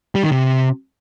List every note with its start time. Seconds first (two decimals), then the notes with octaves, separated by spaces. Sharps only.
0.15 G3
0.23 D#3
0.32 C3